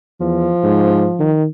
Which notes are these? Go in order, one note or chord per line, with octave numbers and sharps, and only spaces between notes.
E2 F3
G#2
D#3